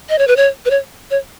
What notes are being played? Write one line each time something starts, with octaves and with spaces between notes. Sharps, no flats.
D#5
C#5
B4
C#5
B4
C#5
C#5